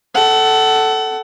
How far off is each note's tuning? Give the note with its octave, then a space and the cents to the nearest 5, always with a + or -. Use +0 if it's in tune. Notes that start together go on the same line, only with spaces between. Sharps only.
A4 +0 F#5 +30